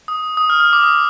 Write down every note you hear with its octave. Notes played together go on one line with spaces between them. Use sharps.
D#6
D#6
F6
F6
D6
D#6